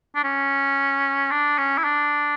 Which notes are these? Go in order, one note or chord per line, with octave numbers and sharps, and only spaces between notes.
D4
C#4
D4
C#4
E4
D4